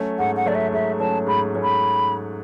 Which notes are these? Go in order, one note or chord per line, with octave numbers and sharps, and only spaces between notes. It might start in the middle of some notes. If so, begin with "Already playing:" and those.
Already playing: F#3 A3 C#4
G#2 F#5
F#5
F#3 A3 C#4 D5
E5
G#2 E5
F#3 A3 C#4 A5
G#2 B5
F#3 A3 C#4
B5